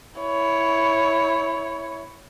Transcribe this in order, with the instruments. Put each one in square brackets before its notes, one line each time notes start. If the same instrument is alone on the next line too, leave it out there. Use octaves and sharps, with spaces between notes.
[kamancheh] E4 C#5